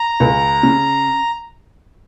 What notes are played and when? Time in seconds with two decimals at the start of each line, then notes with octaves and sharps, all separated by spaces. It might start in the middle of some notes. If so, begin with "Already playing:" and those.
Already playing: A#5
0.20 C#2
0.63 C#3